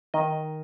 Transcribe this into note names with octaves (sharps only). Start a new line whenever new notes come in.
D#3 D#5